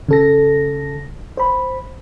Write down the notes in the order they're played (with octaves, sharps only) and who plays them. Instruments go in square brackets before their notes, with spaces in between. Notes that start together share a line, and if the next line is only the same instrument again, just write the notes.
[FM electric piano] C#3 A4 A#6
C5 B5